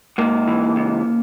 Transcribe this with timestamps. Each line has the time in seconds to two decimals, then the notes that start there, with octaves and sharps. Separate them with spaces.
0.18 G#2 A#3
0.48 E3
0.76 C#2